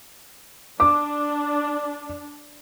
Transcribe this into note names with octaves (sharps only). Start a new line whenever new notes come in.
D4 D6